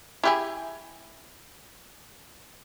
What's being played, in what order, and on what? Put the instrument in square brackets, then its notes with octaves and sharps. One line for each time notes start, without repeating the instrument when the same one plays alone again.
[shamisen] E4 G4 G#4